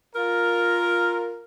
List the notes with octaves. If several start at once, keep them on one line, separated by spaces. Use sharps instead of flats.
F4 A#4